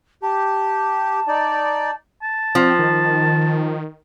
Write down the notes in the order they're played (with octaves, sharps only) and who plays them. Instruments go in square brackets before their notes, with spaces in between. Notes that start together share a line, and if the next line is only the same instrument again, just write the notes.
[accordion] G4 [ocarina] A5
[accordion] D#4 D5
[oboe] A5
[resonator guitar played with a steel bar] F3 [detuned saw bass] C4
[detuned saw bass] D#3